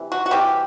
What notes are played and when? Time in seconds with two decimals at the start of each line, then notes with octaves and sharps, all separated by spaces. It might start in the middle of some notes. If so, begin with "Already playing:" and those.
Already playing: C3 E3 G3
0.12 F#4
0.26 F#4
0.31 C3 E3 G3 G4